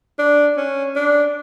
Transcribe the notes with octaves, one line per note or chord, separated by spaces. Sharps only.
D4
C#4
D4